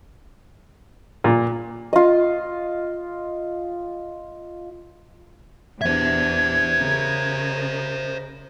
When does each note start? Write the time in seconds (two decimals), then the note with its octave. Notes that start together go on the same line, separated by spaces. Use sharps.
1.24 A#2
1.93 F4 D#5
5.81 E2 D4 C5 E5 G#6
6.79 C#3 A#4 D#5